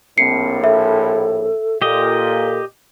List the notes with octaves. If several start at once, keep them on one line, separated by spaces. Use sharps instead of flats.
A#1 A2 C4 C7 C#7
A4 E5
A#2 G4 A4 D#5